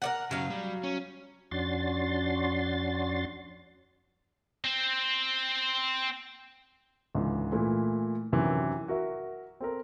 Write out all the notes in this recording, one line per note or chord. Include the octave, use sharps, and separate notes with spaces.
A#4 D5 F#5
F#2 C#3 F#3 F5
G3
C#4
F2 C#4 D4 F#4 C6 A6
C4 C5
C#2 G#2 D3 E3
A#2 E3 A3
F#2 C3 D#3 E3 F#3
F#4 A#4 E5
C4 A4 A#4